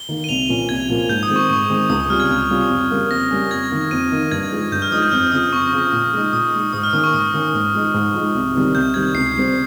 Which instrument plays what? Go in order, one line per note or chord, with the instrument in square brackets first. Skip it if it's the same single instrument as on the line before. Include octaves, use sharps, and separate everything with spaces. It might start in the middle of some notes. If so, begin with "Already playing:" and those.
Already playing: [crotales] G7
[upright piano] D#3 A#3
[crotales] D#7
[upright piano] C2 [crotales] F7
[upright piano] A#2 F3 A#3 C#4
[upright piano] C2 [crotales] G#6
[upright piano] A#2 F3 A#3 C#4
[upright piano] G#2 [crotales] G6
[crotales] D#6
[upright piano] D#3 G#3 C4
[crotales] C#6
[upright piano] G#2 [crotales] C#6
[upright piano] D#3 G#3 C4
[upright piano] C#2 [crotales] D#6
[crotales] D#6
[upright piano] C3 G3 C#4 F4 [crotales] F6
[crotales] G#6
[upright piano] C#2
C3 G3 C#4 F4
F2
C#3 G3 A#3 C#4
[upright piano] F2 [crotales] A#6
[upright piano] C#3 G3 A#3 C#4
[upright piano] F2 [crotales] G#6
[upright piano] D#3 A#3 D#4
[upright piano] F2 [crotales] D#7
[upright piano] D#3 A#3 D#4
[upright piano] G2 [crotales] G#6
[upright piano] F3 G#3 D#4
[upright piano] G2 [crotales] G6
[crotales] F6
[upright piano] F3 G#3 D#4 [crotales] D#6
[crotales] G6
[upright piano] F2 [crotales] F6
[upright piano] C#3 F3 [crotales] D#6
[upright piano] F2 [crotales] C#6
[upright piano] C#3 F3
A#2
G#3 D#4
[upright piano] A#2 [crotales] D#6
[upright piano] G#3 D#4
[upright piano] G#2 [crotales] D#6
[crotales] F6
[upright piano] D#3 A#3 C#4 [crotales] D#6
[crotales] C#6
[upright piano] G#2 [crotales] D#6
[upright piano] D#3 A#3 C#4
G#2
F3 G#3 D#4
G#2
F3 G#3 D#4
C2
C3 D#3 G3
[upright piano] C2 [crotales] G6
[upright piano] C3 D#3 G3 [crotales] G#6
[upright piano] C#2 [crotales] C7
[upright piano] C3 G3 C4